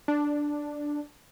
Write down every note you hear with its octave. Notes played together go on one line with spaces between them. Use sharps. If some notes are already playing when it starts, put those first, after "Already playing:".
D4